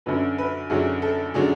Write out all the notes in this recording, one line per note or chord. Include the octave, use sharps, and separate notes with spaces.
F#2 D3 F#3 C#4 B4
B4
F#2 D3 F#3 C#4 G#4
A4
D3 F#3 C#4 G#4